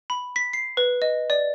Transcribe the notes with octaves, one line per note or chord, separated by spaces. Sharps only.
B5
B6
C7
B4
D#5
D5